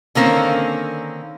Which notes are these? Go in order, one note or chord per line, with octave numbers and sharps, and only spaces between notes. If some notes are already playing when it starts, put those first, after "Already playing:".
D3 D#3 A#3 C4 C#4